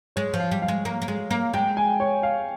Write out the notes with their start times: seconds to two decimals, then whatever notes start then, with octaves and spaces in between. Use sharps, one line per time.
0.16 G#3 C#5
0.34 F3
0.40 F5
0.51 G3
0.62 F5
0.68 G#3
0.85 A#3
1.02 A#3
1.08 G#3
1.31 A#3
1.54 G#3 G5
1.77 G#5
2.00 C#5
2.23 F5